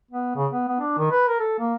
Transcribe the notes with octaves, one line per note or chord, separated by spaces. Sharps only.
B3
C#3
B3
B3
D4
D#3
B4
A#4
A4
A#3